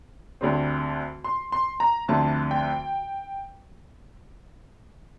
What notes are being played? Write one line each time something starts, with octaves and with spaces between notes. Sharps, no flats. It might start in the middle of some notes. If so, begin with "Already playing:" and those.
D2 D3 G3 C4
C6
C6
A#5
D2 D3 F3 A3 C4 A5
G5